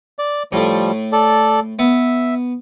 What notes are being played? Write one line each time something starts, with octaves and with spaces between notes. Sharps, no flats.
D5
A2 F3 G3 A3
A4 D5
B3 E5